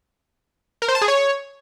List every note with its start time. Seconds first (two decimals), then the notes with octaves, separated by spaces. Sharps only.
0.82 A#4
0.88 C5
0.95 A5
1.02 G#4
1.08 C#5